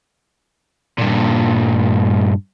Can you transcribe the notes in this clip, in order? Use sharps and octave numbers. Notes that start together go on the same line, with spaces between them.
G2 A#2